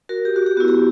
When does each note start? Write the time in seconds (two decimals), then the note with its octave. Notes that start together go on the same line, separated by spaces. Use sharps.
0.09 F#4 A#4
0.25 G4
0.36 F#4
0.46 G4
0.57 B3 F#4
0.60 E4
0.68 G4